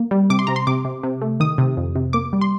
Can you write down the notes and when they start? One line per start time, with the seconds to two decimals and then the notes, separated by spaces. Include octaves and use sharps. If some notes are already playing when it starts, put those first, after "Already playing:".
Already playing: A#3
0.11 G3
0.30 C3 D6
0.39 C6
0.47 C3 A#5
0.56 C6
0.67 C3 D6
0.85 C3
1.03 C3
1.22 A3
1.40 D#3 D#6
1.58 C3
1.77 F2
1.96 C3
2.13 A#3 D6
2.33 G3
2.41 C6